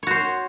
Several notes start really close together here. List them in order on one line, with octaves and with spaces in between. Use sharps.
C#5 F#4 C5